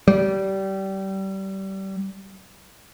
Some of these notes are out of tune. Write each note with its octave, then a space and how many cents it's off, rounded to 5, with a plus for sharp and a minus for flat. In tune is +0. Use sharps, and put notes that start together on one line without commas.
G3 -25